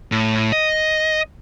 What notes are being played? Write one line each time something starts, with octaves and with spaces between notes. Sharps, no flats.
A2
D#5